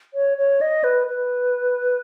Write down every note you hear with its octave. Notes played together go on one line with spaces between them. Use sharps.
C#5
C#5
D#5
B4
B4